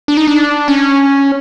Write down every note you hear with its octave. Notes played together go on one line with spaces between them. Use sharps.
D4
D#4
D4
C#4